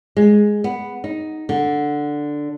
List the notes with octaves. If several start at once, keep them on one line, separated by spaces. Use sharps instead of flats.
G#3
B3
D#4
D3